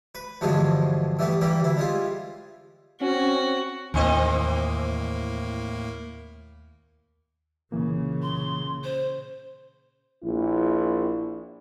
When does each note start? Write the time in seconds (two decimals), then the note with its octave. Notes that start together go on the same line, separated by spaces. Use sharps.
0.15 B4
0.41 E2 G2 B2 D3 F3 G#3
1.19 E3 G3 A3 B3
1.41 E3 G3 A#3 G4
1.60 D2 E4
1.77 G3 G#3 F4
3.01 C4 C#4 F#4
3.94 D#2 A2 E3 A#3 C4 D#5
7.72 C2 A#2 C#3 E3 A#3
8.22 C6
8.84 C5
10.23 A#1 E4